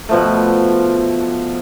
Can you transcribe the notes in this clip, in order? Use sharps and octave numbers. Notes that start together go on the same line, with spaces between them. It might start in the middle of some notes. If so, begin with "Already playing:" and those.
B2 F3 A3